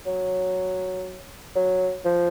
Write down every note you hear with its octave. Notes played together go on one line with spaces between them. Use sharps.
F#3
F#3
F3